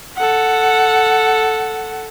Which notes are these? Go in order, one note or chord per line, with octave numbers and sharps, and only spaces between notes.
A4 F#5